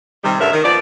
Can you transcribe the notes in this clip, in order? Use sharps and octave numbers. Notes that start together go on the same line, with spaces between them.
C3 D#3 G3
G2 D3 A3 C#4 A#4 E5
D#3
A#2 F3 B3 D5